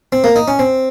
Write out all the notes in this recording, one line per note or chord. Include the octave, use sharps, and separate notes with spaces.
C4
A#3
D#4
C#4
C4